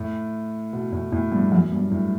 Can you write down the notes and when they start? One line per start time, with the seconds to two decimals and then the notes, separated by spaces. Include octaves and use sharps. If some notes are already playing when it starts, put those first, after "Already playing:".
Already playing: A2
0.73 B2
0.92 A2
1.12 A2
1.32 G2
1.52 F#2
1.72 G2
1.91 A2